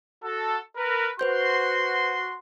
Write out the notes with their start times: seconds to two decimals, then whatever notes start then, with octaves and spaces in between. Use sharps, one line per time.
0.23 F#4 A4
0.76 A#4 B4
1.19 F#4 B4 C5 C6 G6